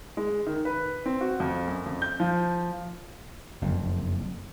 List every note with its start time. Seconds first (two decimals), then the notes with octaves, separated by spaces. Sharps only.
0.17 G#3
0.47 D#3
0.65 B4
1.06 C4
1.21 F#4
1.40 F2
1.67 F#2
1.86 F2
2.02 G6
2.20 F3
3.62 F#1 F2